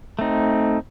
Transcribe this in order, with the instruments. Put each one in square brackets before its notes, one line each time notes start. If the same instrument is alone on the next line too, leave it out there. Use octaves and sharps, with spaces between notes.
[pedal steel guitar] A3 C4 D#4